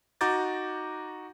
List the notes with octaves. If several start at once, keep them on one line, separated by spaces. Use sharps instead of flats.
D#4 F#4 A#5 D6 G6 A6